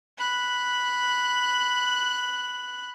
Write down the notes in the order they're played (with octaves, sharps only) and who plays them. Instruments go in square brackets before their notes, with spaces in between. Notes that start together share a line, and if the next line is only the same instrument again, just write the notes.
[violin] B5 F#6